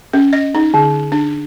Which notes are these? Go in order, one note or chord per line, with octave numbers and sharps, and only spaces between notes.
C#4
D#5
D#4
D3
D4